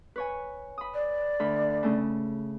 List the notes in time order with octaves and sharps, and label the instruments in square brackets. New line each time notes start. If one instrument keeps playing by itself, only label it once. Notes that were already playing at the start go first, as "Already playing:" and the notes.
[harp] B4 C#5 G#5
B5 D#6
[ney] D5
[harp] D2 B5
C#3 A3 C#4